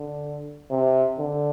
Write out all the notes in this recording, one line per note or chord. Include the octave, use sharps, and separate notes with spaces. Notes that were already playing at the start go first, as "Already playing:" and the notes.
Already playing: D3
C3
D3